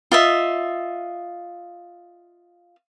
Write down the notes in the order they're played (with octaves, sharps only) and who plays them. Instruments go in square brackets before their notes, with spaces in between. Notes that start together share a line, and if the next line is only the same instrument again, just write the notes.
[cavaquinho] F4 D#5 E5